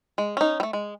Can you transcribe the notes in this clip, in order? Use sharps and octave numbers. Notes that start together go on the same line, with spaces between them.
G#3
C#4 D#4
G3 A3
G#3